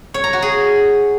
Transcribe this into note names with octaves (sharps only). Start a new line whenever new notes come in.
C#5
A#5
F#4
G#4